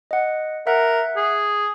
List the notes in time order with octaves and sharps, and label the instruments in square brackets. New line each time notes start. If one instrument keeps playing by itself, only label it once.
[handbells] D#5 F#5
[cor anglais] A#4 [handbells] E5 F#5 F#6
[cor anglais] G#4